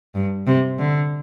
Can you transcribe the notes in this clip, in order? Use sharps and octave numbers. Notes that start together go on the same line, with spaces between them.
G2
C3
D3